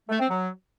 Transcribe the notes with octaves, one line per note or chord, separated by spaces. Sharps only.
A3
C4
F#3